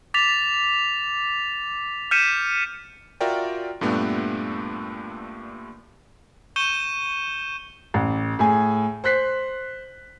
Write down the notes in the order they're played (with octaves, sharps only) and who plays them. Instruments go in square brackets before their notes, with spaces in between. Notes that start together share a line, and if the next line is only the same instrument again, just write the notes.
[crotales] D6 A6 B6 F7
F6 G6 B6 C#7 D#7 E7
[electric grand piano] F4 F#4 A#4 D5 E5 G5
G2 A#2 A3 B3 D4 G4
[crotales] C#6 G6 C#7 D#7 E7 G7
[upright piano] A1
A2 G#4 G#5
C5 F#6 B6 C7